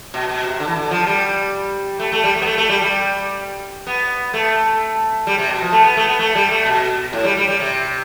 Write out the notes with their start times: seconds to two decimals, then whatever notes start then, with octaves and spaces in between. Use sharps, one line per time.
0.14 B2
0.29 B2
0.44 C3
0.60 D3
0.67 E3
0.76 D3
0.91 F3
1.07 G3
1.99 A3
2.12 A3
2.24 G3
2.35 A3
2.42 B3
2.46 A3
2.58 A3
2.69 G3
2.82 G3
3.87 B3
4.34 A3
5.27 G3
5.38 C3
5.49 B2
5.62 F3
5.72 A3
5.84 B3
5.97 A3
6.08 B3
6.19 A3
6.35 G3
6.51 A3
6.66 B2
7.13 A2
7.25 G3
7.37 G3
7.48 G3
7.60 C3